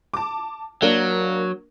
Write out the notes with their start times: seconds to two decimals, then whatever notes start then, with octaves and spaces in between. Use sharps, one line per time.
0.14 A5 D6
0.82 F#3 A#3 D4 A#4